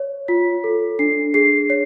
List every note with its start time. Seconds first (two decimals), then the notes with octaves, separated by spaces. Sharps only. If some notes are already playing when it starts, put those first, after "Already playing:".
Already playing: C#5
0.28 F4 B6
0.64 A4
0.99 D4 C7
1.34 G#4 C7
1.70 C#5 C7